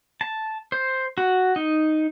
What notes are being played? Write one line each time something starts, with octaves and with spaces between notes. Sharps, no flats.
A5
C5
F#4
D#4